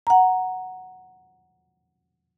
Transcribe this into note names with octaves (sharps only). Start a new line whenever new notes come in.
F#5 A#5